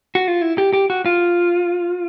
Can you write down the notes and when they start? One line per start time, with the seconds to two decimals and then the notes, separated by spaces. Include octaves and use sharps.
0.15 F#4
0.28 F4
0.41 E4
0.58 G4
0.73 G4
0.90 F#4
1.06 F4